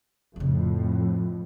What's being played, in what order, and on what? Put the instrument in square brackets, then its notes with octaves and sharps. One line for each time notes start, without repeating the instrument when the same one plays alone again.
[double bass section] F2 A2 [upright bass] C#3 F4